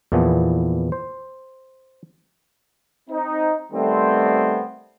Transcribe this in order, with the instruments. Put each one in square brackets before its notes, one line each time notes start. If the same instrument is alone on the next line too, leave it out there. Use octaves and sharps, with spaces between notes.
[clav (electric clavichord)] E2 A#2 E3 F3 B3
C5
[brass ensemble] C4 D#4
D#3 G3 A3 B3 C4